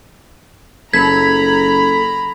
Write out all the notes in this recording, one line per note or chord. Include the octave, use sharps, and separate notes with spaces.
F#1 A4 A#5 B5 G#6 B6